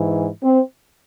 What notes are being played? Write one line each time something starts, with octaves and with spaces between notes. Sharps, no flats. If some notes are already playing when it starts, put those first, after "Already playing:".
Already playing: G#2 E3
C4